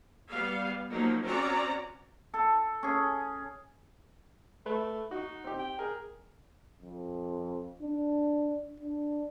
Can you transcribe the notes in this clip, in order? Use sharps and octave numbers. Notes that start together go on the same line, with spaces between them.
G3 B3 F5
F3 F#3 A#3 D#4
C4 C#4 F#4 D5 A#5
A4
C#4 G#4
A3 B4
D#4 F#4
C4 G4
G5
G#4 A#4
F2
D4
D4